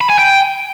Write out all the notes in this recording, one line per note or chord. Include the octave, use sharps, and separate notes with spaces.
B5
G#5
G5